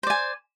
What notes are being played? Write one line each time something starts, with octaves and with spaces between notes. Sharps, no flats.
C5 D5 G#5